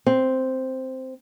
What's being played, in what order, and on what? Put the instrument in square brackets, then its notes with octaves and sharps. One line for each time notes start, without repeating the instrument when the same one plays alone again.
[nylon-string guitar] C4